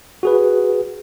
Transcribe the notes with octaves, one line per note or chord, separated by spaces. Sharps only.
F#4 G#4 B4